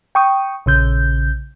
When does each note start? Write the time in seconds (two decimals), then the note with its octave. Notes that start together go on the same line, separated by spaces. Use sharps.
0.15 G5 C#6 D#6
0.66 A#1 C#3 G6